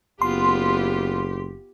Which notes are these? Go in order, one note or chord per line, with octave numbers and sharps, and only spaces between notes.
F#1 B3 F4 G4 C6